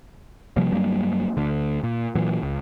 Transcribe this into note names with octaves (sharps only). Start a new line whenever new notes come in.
C3 F3 G3 A#3
G2 F#3 G3 A#3
D2 D3
A#2
A#2 E3 F#3
C#2